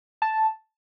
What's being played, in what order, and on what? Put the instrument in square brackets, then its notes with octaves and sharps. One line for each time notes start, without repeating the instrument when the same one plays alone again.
[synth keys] A5